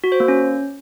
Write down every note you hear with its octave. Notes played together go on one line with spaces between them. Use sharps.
F#4
C5
A#3
C#4